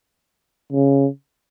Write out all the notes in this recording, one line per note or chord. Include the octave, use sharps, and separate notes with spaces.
C#3